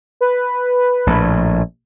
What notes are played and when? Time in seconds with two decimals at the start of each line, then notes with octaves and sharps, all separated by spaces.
0.21 B4
1.07 A#1 A2